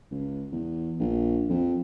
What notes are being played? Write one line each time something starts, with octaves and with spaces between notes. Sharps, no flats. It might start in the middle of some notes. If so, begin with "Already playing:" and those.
C#2
E2
A#1
F2